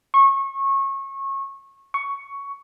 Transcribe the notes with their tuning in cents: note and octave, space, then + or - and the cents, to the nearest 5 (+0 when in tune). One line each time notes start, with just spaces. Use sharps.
C#6 -25
C#6 +10